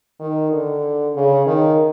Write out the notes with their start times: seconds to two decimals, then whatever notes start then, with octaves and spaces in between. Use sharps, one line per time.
0.20 D#3
0.52 D3
1.15 C#3
1.47 D#3